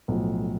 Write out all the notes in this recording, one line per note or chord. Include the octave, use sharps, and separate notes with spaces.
B1 A2 F3